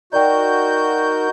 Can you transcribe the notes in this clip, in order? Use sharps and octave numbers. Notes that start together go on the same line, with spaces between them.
D#4 F#4 A#4 D5 G5 G6